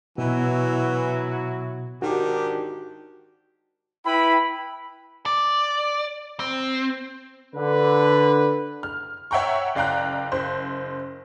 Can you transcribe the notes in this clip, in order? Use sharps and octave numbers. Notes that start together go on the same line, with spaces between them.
B2 E3 F#3 E4 F#4
G#2 D#3 D4 F#4 G4
E4 B4 G5 B5
D5
C4
D3 B4
F6
C#5 E5 F#5 G5 A#5 C#6
F#1 D5 F5 G5 A#5 F#6
F#1 C5